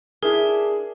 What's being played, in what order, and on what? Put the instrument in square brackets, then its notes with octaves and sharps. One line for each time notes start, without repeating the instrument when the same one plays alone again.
[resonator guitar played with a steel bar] D4 E4 [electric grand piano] G#4 [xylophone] A#4